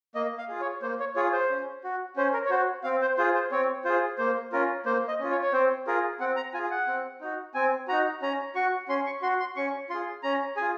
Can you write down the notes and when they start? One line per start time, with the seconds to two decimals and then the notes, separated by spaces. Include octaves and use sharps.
0.15 A#3 D#5
0.38 F5
0.49 F4 G#4
0.61 C#5
0.82 A#3 C5
1.00 C#5
1.16 F4 G#4 C#5
1.32 C5
1.50 C#4
1.84 F#4
2.16 C#4 C5
2.33 A#4
2.45 C#5
2.50 F#4 C5
2.84 C4 F5
3.01 C5
3.17 F4 G#4 C5
3.34 C5
3.51 C4 C#5
3.85 F4 G#4 C5
4.18 A#3 C5
4.52 C#4 F4 A#4
4.86 A#3 C5
5.08 D#5
5.20 C#4 F4
5.30 C#5
5.43 C#5
5.53 C4 C5
5.87 F4 G#4 A#4
6.20 C4 F#5
6.36 A#5
6.54 F4 G#4 G#5
6.70 F#5
6.87 C4
7.21 D#4 F#4
7.54 C4 G#5
7.88 D#4 F#4 A#5
8.22 C#4 A#5
8.55 F#4 C#6
8.88 C#4 C6
9.06 C#6
9.22 F#4 C6
9.40 C6
9.56 C#4 C#6
9.90 F4 G#4 C6
10.23 C#4 A#5
10.57 F4 G#4 G#5